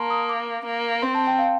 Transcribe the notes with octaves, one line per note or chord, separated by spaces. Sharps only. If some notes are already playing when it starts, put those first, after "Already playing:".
Already playing: A#3 A5 A#5 C6
D#6
D6
A#3
C4 C6
A5
G5
F5